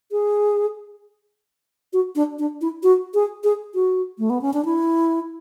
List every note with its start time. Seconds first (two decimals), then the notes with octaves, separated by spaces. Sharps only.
0.12 G#4
1.93 F#4
2.16 D4
2.39 D4
2.61 E4
2.83 F#4
3.14 G#4
3.44 G#4
3.74 F#4
4.19 A3
4.30 B3
4.42 C#4
4.53 D4
4.65 E4